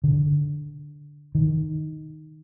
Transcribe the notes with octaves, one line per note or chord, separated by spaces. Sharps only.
D3
D#3